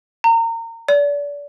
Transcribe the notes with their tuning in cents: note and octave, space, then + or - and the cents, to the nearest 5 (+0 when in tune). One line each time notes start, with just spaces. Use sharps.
A#5 -30
D5 -30